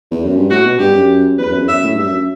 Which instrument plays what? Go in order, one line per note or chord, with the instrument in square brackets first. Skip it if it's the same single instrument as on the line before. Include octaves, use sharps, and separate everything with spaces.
[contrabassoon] E2
F#2
G2
[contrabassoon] A2 [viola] F#4
[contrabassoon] B2
[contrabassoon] G2 [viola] G4
[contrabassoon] F#2
[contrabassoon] E2 [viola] B4
[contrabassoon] F#2
E2
[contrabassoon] F#2 [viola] E5
[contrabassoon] A2
[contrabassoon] G2 [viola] E5
[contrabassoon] F#2